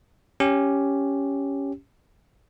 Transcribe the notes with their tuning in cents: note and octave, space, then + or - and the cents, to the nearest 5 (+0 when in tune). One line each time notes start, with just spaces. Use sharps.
C#4 +5 G4 +0